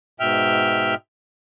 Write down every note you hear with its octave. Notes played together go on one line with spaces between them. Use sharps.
G#2 B2 E5 G5 F6